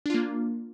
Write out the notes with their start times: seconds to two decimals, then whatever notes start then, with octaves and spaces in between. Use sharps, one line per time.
0.06 D4
0.10 F4
0.14 A#3